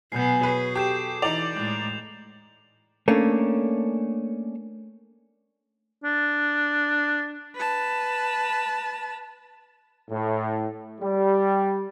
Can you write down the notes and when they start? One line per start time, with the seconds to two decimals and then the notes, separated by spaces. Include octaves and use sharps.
0.12 B2 F#3 B3 B4 G#5 G6 C7
0.43 F#4 G#4 B4 C#5
0.75 G4 A4 D6 G6 E7
1.22 E3 D#4 D5 F7
1.56 A2 G#3 G5
3.08 A3 A#3 C#4 D4
6.04 D4
7.55 B4 A5
10.10 A2
11.00 G3